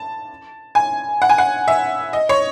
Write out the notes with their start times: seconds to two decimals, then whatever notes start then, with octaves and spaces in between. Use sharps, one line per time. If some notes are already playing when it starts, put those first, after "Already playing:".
Already playing: A5
0.75 G#5
1.22 F#5
1.29 G#5
1.38 F#5
1.68 E5
2.13 D#5
2.29 C#5